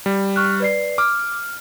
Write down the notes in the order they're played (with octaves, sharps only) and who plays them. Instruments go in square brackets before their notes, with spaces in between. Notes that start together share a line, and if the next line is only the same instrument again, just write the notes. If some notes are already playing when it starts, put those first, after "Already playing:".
[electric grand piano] G3
[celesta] C#6 F6 F#6
B4 D5 C7
[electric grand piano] D6 [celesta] F6